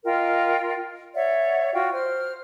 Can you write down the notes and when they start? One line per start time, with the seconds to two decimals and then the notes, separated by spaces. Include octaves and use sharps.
0.05 F4 A#4 D#5 G5
1.14 C#5 D5 E5 F#5
1.73 F4 F#4 F5 G5
1.92 C5 F6